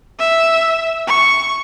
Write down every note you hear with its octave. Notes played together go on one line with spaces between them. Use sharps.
E5
C#6